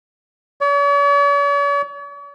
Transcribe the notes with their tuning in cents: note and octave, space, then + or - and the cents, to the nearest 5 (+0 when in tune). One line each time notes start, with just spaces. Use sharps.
C#5 +45